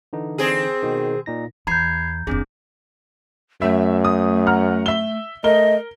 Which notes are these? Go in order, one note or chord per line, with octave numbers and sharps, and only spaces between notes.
D3 E3 D#4
C4 G#4
B2 D#3
A#2 D#4 A#6
E2 A#5 B5 G6 G#6 C7
F1 D#2 C4 D4 G#4
F#2 A3 E5
D#6
F#5 A#5 F6
E5 G7
A3 A#4 D#5 G7